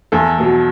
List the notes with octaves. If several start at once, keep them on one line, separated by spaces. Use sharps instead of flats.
E2 A4
B2 F#3